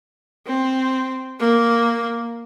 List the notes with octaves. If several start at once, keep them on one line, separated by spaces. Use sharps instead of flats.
C4
A#3